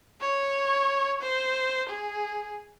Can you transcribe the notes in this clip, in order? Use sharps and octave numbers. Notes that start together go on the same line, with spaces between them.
C#5
C5
G#4